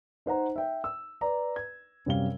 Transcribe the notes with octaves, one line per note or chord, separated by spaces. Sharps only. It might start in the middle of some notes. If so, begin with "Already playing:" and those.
D#4 C5 F#5 A#5
E5 G5
E6
B4 D5 A#5
G#6
F#2 C3 G3 F5 G7